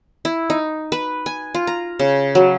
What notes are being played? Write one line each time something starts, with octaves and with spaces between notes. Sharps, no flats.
E4
D#4
B4
G#5
F4
A#5
C#3
F#3